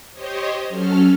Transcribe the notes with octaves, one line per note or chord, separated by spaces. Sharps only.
G4 C5 C#5 D#5
F#3 C#4 A4 F6